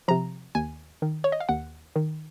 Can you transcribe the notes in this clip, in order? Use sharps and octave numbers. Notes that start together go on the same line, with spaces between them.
C3 F3 A#5
D#2 G#5
D#3
C#5
D#5
F5
D#2 F#5
D#3